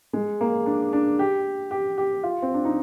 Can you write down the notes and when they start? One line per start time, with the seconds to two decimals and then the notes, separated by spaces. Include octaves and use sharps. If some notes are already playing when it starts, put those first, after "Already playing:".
0.13 G#3
0.41 A#3
0.66 D4
0.93 D4
1.19 G4
1.71 G4
1.98 G4
2.23 F4
2.42 C4
2.54 D4
2.65 D#4